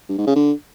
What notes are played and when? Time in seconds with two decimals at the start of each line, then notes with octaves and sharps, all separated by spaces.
0.09 G2
0.18 G#2
0.27 C#3
0.36 D3